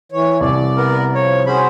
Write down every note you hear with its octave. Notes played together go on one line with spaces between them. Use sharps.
E3 C#5
C2 D5
B3 A#4
F3 C#5
C#4 F#4 G#4 C5 B5